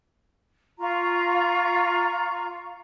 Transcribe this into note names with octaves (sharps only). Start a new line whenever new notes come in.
F4 A#5 C#6